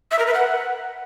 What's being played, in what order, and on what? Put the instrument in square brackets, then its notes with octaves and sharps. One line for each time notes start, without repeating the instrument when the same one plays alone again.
[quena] E5
A#4
B4
F#5